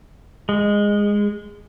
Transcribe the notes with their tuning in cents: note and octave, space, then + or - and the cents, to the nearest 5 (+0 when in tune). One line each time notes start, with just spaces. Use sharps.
G#3 -15